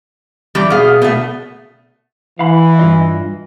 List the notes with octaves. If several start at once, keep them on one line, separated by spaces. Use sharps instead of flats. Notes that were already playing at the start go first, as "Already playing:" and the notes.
E2 G3 G4
B2 G#4 F5
B2 A3
E3 F5 F#5 B5
G2 F4 D#5